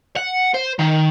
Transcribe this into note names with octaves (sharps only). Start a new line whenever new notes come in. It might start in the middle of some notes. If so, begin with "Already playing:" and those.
F#5
C5
D#3